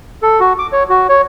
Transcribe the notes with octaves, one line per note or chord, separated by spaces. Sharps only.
A4
F#4
D6
C#5
F#4
C#5